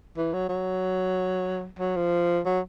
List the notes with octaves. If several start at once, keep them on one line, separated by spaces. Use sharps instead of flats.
E3
F#3
F#3
F#3
F3
F#3